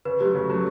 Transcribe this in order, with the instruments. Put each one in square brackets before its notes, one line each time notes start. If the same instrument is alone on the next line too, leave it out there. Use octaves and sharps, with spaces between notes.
[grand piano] C#3 [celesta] B4
[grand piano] F#3 A3 [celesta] G4
[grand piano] C#3
F#3 A3